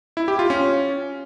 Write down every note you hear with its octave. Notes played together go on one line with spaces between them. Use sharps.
E4
G4
F4
C#4